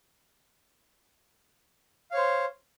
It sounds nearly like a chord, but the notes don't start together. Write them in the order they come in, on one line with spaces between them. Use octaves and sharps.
F5 C#5 C5